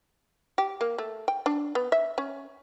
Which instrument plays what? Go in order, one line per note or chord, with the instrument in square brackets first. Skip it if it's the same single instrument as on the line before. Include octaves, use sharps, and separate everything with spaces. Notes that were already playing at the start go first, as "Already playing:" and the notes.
[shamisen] G4
A#3
A3
G5
D4
B3
E5
C#4